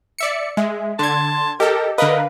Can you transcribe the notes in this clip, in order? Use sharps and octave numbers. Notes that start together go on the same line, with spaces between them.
D5 E5 C#7
G#3 E5
D3 A5 C6 G#6
G4 A4 A#4 D#5
D3 A#4 B4 D#5 F5